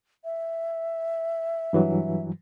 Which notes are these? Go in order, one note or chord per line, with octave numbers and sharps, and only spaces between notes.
E5
G2 E3 F#3